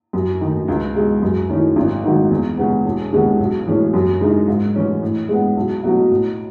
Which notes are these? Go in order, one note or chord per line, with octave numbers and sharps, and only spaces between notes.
F#2
D#3 A3 D#4
C#2
B2 G#3
F#2
D#3 A3 C#4 E4
G#1
G#2 D#3 F#3 A3
E2
C#3 G#3 B3
E1
D#2 C#3 G#3 B3
B1
A2 E3 G#3 C#4
F#2
C#3 G#3 D#4
G#2
E3 A3 C#4 E4
A2
G#3 B3
B1
B2 F#3 A3
A2